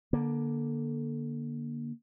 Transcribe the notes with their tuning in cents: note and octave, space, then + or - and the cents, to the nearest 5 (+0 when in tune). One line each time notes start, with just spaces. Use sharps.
D3 -5 A#3 +20